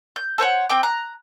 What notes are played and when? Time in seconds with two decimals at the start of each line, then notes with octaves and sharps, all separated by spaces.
0.16 G6
0.38 A4 C5 C#5 F#5
0.70 C4 G5 D6
0.83 A#5 F#6